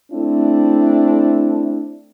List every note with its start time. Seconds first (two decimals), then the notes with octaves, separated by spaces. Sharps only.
0.12 A3 C4 D4 E4